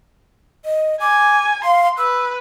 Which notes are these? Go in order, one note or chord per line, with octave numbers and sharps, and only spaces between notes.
D#5
G#5 D6
F5 C6
B4 E6